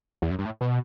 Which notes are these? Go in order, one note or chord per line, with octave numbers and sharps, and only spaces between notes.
E2
F#2
G2
A2
B2